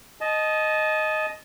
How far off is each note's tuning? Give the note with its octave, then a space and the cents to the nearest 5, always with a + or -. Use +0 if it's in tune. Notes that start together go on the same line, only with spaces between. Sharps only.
D#5 +0 A5 -30